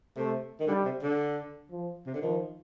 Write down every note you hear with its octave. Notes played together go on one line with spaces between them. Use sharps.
C3 A3
D#3
D3 G3
C3
D3
F3
C3
D3
D#3 F3